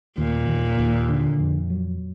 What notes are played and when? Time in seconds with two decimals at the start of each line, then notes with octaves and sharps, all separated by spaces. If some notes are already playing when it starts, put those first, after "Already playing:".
0.17 D#2 A#2
0.48 D#2
0.79 D#2
1.09 D3
1.39 F2
1.70 F#3